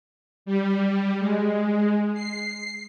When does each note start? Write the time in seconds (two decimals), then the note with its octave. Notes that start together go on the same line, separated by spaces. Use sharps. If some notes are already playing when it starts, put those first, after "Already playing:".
0.46 G3
1.19 G#3
2.14 C7